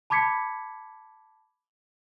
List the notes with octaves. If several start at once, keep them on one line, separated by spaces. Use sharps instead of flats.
A5 B5 D6 G#6 B6 C#7